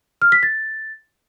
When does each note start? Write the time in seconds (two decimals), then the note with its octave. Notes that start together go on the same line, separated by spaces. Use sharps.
0.22 F6
0.32 B6
0.43 A6